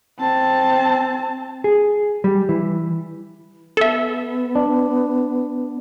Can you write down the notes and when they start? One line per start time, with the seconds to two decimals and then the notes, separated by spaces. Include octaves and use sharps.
0.20 C4 A5
1.64 G#4
2.24 G3
2.49 E3
3.77 B3 A4 E5
4.55 D4